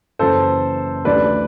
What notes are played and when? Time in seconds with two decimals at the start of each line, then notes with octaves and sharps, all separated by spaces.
0.19 F#1 F#2 E3 A4 C5
1.05 D2 C3 E3 B4 D5